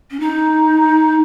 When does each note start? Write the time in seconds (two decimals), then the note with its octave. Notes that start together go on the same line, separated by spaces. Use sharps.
0.11 C#4
0.20 D#4